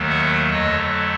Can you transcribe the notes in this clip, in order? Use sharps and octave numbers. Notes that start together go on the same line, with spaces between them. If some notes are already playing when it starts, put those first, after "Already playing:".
Already playing: D#2 D#3 F#3 A3
E5 F#5
F2 D3 F#3 A3 C#5 D#5